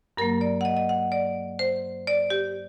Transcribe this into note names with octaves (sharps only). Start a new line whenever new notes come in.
G2 F#3 A#3 A#4
D5
F#5
D#5
D#5
F#5
D5
C5
D5
G4